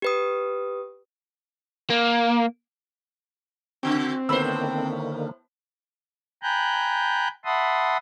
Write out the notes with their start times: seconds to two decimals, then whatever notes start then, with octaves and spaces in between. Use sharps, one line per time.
0.02 G4 B4 D#6
1.90 A#3
3.83 C#3 C4 F#4
4.29 A2 D3 D#3 A#3 B3 C5 B5 E6
6.43 G5 G#5 A#5 B5 F#6 G6
7.45 E5 F#5 A5 B5 C6 D#6